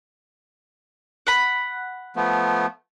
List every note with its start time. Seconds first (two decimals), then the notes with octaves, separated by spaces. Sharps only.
1.27 F#5 B5
2.16 F3 A3 B3